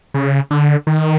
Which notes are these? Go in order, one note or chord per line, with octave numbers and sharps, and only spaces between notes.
C#3
D3
D#3